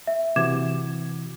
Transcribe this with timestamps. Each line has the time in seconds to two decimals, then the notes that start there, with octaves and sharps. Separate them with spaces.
0.07 E5
0.36 C3 E3 F#4 D6 G#6 E7